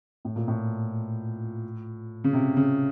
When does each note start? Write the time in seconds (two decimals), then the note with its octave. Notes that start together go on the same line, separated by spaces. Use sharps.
0.25 A2
0.36 A#2
0.48 A2
2.24 C#3
2.33 C3
2.57 C#3